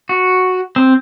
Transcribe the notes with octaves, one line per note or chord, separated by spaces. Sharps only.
F#4
C4